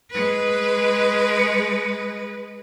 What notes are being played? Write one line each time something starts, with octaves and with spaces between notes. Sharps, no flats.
G#3 B4